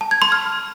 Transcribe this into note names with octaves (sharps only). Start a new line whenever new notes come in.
A5
G#6
C6
F6